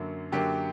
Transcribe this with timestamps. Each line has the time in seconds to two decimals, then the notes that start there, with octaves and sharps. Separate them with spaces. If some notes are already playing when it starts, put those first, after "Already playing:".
Already playing: F#2 D3 F#3 A#3
0.32 F#2 D3 F#3 A#3 G4